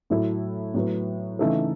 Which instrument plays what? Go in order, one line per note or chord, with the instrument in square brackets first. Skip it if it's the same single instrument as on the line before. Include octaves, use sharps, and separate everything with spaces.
[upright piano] A2 F#3 A3 E4 A4
A2 F#3 B3
C#3 E3 A3 D#4 A4